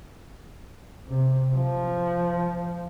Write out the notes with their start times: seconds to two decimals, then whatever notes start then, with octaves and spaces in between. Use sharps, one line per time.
1.08 C3
1.54 F3